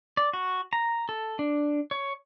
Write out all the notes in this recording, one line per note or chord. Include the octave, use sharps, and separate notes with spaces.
D5
F#4
A#5
A4
D4
C#5